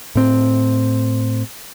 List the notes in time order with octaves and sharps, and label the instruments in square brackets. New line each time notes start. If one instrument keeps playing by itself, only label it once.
[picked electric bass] A2 C4